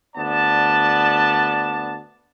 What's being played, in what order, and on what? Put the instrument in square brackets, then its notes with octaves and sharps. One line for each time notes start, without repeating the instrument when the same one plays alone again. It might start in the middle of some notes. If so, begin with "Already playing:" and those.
[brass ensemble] D2 B3 D5 A5